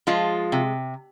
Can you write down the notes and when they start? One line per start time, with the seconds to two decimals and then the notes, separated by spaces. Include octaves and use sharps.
0.07 F3 G#3 F4
0.52 C3